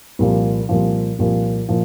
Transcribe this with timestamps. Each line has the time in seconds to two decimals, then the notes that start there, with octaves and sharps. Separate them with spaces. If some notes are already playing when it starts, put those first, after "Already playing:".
0.19 C2 A#2 F3
0.69 C2 A#2 F3
1.19 C2 A#2 F3
1.69 A#2 F3